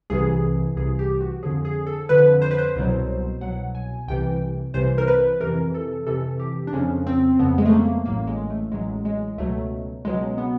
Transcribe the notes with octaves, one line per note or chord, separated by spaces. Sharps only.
C2 C3 E3 G#4
C2 C3 E3 G#4
G4
F#4
F2 D3 F3 G#4
G#4
A4
F2 D3 F3 B4
C5
B4
C5
C2 B2 F#3
C2 B2 F#3 F#5
G#5
C2 C3 E3 G5
C2 C3 E3 C5
A#4
B4
F2 C3 E3 A#4
A4
F2 C3 E3 A4
G4
D4
F2 C#3 F3 C#4
C4
F2 C#3 F3 B3
G#3
A3
A#3
A1 A2 F#3 A#3
G#3
A3
A1 A2 F#3 G#3
G#3
C#2 B2 F#3 A3
C#2 B2 F#3 G#3
B3